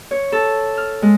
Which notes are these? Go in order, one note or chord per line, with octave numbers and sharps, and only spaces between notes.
C#5
A4
F6
G#3